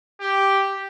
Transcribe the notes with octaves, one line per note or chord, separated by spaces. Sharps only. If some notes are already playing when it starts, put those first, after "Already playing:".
G4